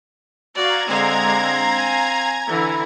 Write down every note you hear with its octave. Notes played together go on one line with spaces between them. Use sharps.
F#4 D5 F5 A#5 G#6
D3 G#3 C4 D4 F5
G#5
D3 E3 E4